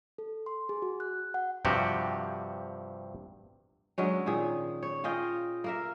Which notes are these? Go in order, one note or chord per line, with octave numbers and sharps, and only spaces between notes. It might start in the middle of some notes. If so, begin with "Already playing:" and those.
A4
C6
G#4
F#4
F#6
F#5
G2 C3 F3 F#4 G4
D3 F#3 G#3 C#4
A#2 D#3 G#4
C#5
F4 G#4 D#5 G5
A#3 A#4 E5